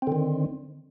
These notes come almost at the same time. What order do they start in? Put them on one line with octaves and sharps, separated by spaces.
C4 D3 D#3